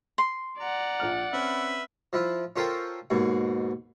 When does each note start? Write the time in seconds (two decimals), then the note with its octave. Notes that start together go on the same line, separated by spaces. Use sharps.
0.18 C6
0.60 D5 F#5 A#5
1.00 A#1 F3 F6
1.33 C4 C#4 B4 E5
2.13 F3 E4 F4
2.56 C#4 F4 A4 A#4 C5 G5
3.10 D#2 G#2 B2